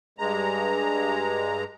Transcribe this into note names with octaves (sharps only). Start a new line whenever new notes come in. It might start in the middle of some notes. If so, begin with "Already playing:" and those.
G2 G#3 A#5